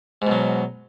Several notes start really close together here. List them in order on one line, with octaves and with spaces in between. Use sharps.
G#2 B2 F#3